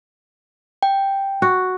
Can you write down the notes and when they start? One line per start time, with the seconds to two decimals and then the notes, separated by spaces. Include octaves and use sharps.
0.83 G5
1.42 F#4